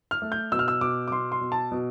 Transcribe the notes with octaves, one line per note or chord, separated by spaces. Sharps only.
F6
A3
G6
B2 E6
F6
E6
B2 D6
D6
B2 C6
C6
B2
A5
B2